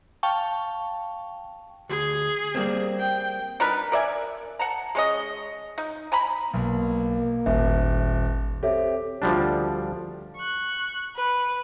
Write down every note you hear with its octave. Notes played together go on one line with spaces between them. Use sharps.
F5 G5 A5 C#6
D2 G#4
G3 A#3 C4
G5
D4 D#4 A#4 B4
A#4 D5 E5 G#5
F#5 A5 A#5
G#3 C#4 D#5
D#4
G#5 A#5 B5
B1 A#3
D#1 G#1 E5
C4 G4 A4 C#5 E5
D2 F3 G3 D4
C#6 F#6
B4